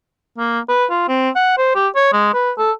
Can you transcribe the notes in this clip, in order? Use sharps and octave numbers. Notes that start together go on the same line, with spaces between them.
A#3
B4
F4
C4
F#5
C5
G4
C#5
G#3
B4
A4